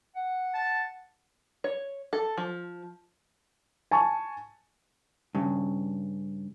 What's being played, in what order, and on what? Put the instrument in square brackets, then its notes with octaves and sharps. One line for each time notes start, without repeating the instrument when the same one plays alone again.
[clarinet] F#5
[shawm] A5
[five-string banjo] C#5
A4
F3
[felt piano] G#5 A5 C#6
[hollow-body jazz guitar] G2 C#3